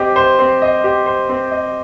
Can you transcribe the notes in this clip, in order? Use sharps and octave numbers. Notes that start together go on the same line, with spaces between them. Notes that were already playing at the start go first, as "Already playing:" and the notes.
Already playing: C4 G4 D#5
C5
C4
D#5
G4
C5
C4
D#5